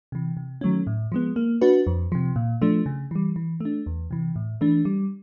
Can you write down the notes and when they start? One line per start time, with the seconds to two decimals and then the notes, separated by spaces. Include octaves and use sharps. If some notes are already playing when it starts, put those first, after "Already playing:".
0.12 C3 E3
0.37 C3
0.61 D#3 F#3 A3 C#4
0.87 A2
1.12 F3 G#3 B3
1.36 A#3
1.61 D4 F#4 B4
1.87 F2
2.12 C3 F3
2.36 A#2
2.62 F3 A3 D4
2.86 C#3
3.11 E3 G3
3.36 E3
3.60 A3 D4
3.86 E2
4.11 C3 E3
4.36 A2
4.61 E3 A3 D4
4.85 G3